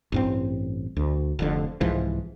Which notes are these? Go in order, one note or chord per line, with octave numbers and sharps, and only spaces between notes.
A1 G2 C4
D2
F1 F2 D3
C2 G#2 E3 F3